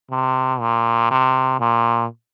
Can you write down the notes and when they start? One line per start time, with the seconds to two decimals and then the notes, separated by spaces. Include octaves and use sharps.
0.10 C3
0.60 A#2
1.11 C3
1.60 A#2